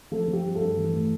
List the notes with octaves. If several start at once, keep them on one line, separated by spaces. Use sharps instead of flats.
F3 A4
F3
G4
G2
A4
G2
E3
A2